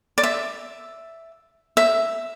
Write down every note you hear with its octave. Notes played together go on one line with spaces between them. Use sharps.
D5
E5
E5